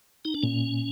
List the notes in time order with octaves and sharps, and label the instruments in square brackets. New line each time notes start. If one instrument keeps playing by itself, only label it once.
[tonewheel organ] D#4
D4
[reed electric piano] A#2 [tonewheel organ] C#4